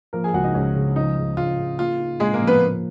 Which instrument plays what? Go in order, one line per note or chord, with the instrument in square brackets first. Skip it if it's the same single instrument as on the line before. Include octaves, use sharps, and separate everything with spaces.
[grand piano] F3 [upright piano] A#3 A#4
[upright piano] G#4 G#5
[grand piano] C#2 [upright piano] F#4 F#5
[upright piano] D#4 D#5
[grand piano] C#2 [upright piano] C#4 C#5
[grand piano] C#3
[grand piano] F3 [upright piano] D#4
[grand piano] C#2
[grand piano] C#2 [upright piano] F4
[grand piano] C#3
[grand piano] A#3 [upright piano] F4
[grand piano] D#4
[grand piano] A#2 [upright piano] G#3 G#4
[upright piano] A#3 A#4
[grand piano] F3
[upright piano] B3 B4
[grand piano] A#3